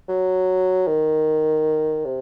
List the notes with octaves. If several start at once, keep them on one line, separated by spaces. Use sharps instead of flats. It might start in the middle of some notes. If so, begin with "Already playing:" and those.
F#3
D#3
C3